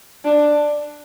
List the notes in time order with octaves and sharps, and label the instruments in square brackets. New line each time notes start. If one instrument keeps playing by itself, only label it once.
[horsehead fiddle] D4